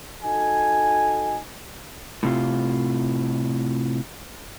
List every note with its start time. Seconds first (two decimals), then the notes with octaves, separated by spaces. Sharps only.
0.23 D#4 F#4 A4 G#5
2.23 A2 C3 F4